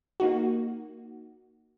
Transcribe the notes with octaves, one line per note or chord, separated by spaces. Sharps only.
A#3 D#4 F#4